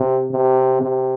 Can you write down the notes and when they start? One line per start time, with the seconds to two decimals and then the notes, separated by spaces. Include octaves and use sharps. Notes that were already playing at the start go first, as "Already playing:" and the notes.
Already playing: C3
0.31 C3
0.81 C3